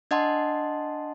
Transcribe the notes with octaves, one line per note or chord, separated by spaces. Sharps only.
D4 D#5 F#5 A5 C6